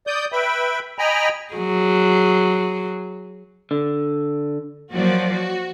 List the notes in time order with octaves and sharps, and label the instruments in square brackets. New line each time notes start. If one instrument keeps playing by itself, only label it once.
[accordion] D5 D#6 G6
B4 E5 G5 B5
D#5 G5 G#5 A#5 B5
[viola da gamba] F#3 G#4
[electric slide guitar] D3
[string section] F3 F#3 A#3 F#4 D5
F#4